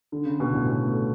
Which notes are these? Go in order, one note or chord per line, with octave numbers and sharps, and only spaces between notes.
D3
C#3
B2
A2
B2
A3